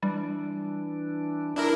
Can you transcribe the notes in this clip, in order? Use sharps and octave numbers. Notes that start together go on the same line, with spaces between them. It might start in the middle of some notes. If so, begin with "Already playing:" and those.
E3 G3 D4
D4 E4 A#4